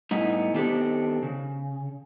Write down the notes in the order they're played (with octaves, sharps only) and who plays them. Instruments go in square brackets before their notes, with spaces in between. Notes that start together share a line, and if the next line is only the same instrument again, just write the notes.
[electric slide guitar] A2 G3 B3 D#4 E4
D#3 B3 C4 D4 G4 A4
C#3